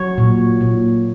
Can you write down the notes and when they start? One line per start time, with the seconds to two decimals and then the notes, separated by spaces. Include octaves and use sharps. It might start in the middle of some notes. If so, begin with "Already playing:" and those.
Already playing: F#3 C#5
0.18 A#2
0.61 A#2